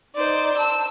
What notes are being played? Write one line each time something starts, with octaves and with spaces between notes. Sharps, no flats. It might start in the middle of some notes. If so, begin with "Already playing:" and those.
D#4 C5 D5
A5 E6